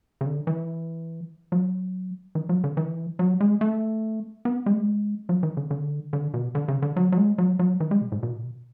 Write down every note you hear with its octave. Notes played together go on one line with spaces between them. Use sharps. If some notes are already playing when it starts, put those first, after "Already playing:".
C#3
D3
E3
F#3
E3
F#3
D3
E3
F#3
G#3
A3
B3
G#3
A3
G#3
F#3
E3
D3
D3
D3
B2
D3
C#3
D3
F#3
F#3
G#3
F#3
F#3
E3
G#3
B2
A2
B2
A2
B2